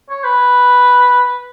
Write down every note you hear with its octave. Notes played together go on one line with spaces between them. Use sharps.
C#5
B4